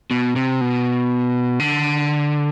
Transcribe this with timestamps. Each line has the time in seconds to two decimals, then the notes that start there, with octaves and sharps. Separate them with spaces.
0.11 B2
0.36 C3
0.61 B2
1.60 D3